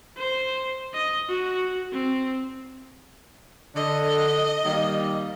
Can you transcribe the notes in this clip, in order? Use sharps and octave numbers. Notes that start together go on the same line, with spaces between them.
C5
D#5
F#4
C4
D3 D#5
D#3 G3 A#3